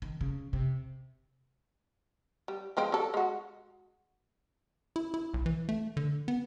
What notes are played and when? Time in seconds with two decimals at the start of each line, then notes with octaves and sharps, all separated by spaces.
0.02 D#3
0.21 C#3
0.53 C3
2.48 G3
2.77 F3 G#3 C4
2.92 F#3 A4
3.14 G#3 F#4
4.96 E4
5.14 E4
5.34 B1
5.46 E3
5.69 A3
5.97 D3
6.28 B3